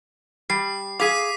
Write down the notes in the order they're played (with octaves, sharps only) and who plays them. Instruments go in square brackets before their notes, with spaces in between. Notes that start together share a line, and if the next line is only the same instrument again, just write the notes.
[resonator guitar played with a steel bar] G3 [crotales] C7
[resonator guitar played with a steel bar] G#4 F5 [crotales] D6 B6 D#7